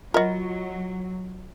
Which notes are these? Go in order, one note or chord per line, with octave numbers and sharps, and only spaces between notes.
F#3 F4 F#4 A#4 D#5